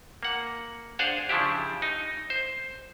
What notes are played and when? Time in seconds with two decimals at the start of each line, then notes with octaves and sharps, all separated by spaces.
0.23 A#3 F#5
0.99 D4 G#4 C5 F5 F#5
1.29 C#3 F3 D4 E4 G4
1.82 D#4
2.30 C5